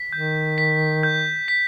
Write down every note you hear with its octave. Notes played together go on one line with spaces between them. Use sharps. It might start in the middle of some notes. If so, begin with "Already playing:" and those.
Already playing: B6
D#3 G6
B6
G6
B6